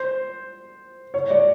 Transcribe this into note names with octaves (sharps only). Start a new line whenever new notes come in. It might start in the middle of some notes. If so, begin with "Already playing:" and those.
Already playing: C5
C#5
D5